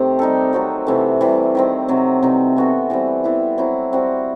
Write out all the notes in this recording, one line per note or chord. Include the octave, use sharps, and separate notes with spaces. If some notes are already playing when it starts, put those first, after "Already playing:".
Already playing: C3 D#3 A3 C4 G4
G3 D#4 A4
F#3 C4 F#4 A4
C3 E3 A3
C3 E3 G3
D#3 G3 C4
C3 F#3 C4
C3 E3 G3 D#4
E3 B3 F#4 A4
E3 G3 C4
E3 B3 E4
F#3 C4 E4
G3 C4 F#4